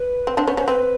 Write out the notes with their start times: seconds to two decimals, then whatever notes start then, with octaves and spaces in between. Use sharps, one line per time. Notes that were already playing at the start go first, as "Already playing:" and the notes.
Already playing: B4
0.27 C4
0.37 C4 D4
0.47 B3 C#4 C5
0.57 B3 C#4 C5
0.67 C4 B4